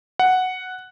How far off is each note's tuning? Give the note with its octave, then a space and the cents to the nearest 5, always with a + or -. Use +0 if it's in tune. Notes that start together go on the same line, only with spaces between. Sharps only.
F#5 +0